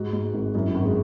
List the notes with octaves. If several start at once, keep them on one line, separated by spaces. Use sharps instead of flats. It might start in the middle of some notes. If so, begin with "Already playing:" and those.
Already playing: G#2 F#4
G#2
G#1
F#2 E4
G#1
G#3